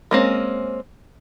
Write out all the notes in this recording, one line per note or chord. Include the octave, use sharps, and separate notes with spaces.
G#3 A#3 C4 C#4